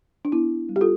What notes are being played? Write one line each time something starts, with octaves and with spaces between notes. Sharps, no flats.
D4
B3 E4
G3
G4
F4 A4